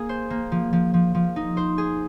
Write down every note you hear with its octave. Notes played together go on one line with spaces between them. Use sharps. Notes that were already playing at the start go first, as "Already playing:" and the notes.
Already playing: A#3 G#4
C5
A#3
F3
F3
F3
F3
D#4
C5
G#4